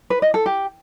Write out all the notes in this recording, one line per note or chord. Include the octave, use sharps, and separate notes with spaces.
B4
D#5
A4
G4